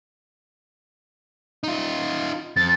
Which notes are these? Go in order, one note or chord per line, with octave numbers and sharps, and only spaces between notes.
D#4 F4
F2 A6